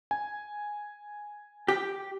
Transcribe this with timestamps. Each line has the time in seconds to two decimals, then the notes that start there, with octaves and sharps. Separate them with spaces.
0.11 G#5
1.68 G4